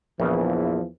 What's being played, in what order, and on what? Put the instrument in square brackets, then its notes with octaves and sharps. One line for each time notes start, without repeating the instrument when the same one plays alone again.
[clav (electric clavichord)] A#1 C#3 [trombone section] E2 E3 F3